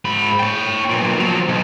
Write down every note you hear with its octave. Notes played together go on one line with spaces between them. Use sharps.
G#2 B5
C#5 G5
B1 A#2
F3 F#3
B1